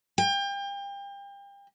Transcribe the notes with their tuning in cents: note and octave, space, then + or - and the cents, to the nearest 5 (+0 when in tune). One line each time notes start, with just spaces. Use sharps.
G5 +35